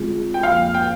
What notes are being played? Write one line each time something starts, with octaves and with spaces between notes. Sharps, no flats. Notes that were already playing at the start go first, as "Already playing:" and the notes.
Already playing: D3 G#3 C4 F4 G#4
G5
F2 D3 F3 A#3 F5
G5